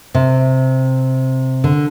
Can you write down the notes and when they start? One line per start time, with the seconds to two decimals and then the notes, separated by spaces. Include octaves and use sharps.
0.15 C3
1.64 D3